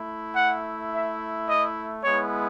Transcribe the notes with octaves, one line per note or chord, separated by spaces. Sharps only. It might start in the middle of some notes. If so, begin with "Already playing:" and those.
Already playing: A3 E4
F#5
E5
D#5
G#3 B3 E4 C#5